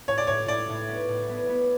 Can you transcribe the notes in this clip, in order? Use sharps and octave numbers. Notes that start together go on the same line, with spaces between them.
A2 C#5
D5
A2 C#5
A2 D5
A2
B3
A2
B3
B3